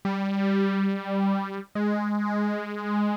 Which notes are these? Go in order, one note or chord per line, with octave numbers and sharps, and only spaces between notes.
G3
G#3